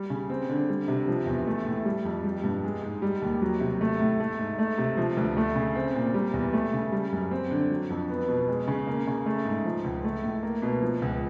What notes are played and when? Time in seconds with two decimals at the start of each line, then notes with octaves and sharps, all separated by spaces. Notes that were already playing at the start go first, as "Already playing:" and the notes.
Already playing: G3
0.10 C#3
0.30 C4
0.49 D3
0.69 G3
0.88 C3
1.08 F3
1.27 E2
1.47 A3
1.66 A2
1.85 G3
2.05 F2
2.24 G3
2.44 G2
2.64 G#3
2.83 G#2
3.02 G3
3.22 D#2
3.42 F#3
3.60 C3
3.81 A3
4.00 A2
4.20 A3
4.39 G#2
4.59 A3
4.78 C3
4.97 F3
5.17 D2
5.37 A3
5.56 C#3
5.75 C4
5.95 A#2
6.14 G3
6.34 E2
6.53 A3
6.73 C#3
6.92 G3
7.12 F#2
7.31 C4
7.51 D3
7.70 F#3
7.90 F2
8.09 B3
8.29 B2
8.48 G#3
8.67 C#3
8.87 A#3
9.07 C#3
9.26 A3
9.45 G#2
9.65 F3
9.84 C#2
10.04 A3
10.23 A2
10.43 A#3
10.62 B2
10.81 F3
11.02 C#2